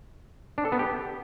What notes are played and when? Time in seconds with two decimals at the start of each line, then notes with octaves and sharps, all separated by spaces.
0.58 D4
0.65 A4
0.72 B3
0.79 G4